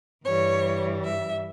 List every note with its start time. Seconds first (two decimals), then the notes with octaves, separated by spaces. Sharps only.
0.25 G2 E3 G3 C#5
1.04 E5